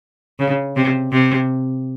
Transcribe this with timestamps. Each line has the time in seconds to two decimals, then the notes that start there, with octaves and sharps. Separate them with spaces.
0.39 C#3
0.76 C3
1.12 C3